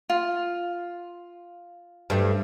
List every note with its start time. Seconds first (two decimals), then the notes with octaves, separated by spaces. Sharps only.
0.10 F4
2.10 G2 A3